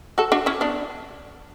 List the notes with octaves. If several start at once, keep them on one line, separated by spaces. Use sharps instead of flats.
F#4 A4
D4 F#4
C#4 E4
B3 D4